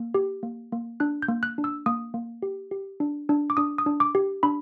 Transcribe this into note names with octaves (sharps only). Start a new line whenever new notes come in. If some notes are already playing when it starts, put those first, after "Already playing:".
Already playing: A#3
G4
A#3
A#3
D4 F#6
G6
A#3
F#6
D4
E6
A#3 D#6
A#3
G4
G4
D4
D4
D6
D4 D#6
D#6
D4
D6
G4
D4 B5